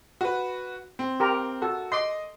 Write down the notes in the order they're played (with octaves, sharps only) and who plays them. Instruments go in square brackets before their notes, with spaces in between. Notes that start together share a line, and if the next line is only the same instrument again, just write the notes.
[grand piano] F#4 B4
C4
[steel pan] G4 A#4
[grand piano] F#4 [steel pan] A4
[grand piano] D#5 D6 [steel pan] C6